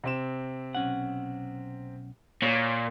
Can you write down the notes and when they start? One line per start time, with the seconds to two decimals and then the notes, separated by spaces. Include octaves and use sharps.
0.04 C3 C4 E7
0.75 B1 C#4 F#5
2.42 A#2 C#5